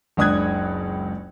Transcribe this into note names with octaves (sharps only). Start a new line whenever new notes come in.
F#1 C#2 D4 D#6 F#6 G#6